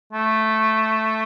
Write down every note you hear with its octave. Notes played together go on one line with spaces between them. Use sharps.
A3